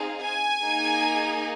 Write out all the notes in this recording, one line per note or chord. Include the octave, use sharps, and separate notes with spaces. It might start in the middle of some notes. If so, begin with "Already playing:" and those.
Already playing: C4 D#4 G#4 F5
G#5
A#3 D#4 G#4